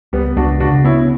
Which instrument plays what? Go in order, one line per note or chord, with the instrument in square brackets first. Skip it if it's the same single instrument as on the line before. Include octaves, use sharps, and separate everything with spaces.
[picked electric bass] C#2 [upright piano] G3 B3
[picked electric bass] C#2 [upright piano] D4 F#4
[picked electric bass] C#3 [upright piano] D4 F#4
[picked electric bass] B3 [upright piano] C#4 E4